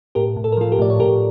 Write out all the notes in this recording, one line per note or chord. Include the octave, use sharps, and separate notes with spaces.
A2 G4 A#4
A2
A4
A#4
F3 F4 A4
G4 A#4
A2 D5
C#5
A2 G4 A#4